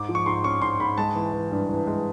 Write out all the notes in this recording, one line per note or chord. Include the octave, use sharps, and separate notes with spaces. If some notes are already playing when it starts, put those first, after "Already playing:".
Already playing: G#2 D6
F3
C#6
G#2 C6
C#4 C#6
G#2 C6
G#2 B5
G#3 A5
E3
E3
G2
E3
G#3